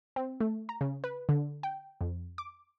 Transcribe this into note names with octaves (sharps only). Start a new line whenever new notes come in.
C4
A3
A#5
C#3
B4
D3
G5
F2
D6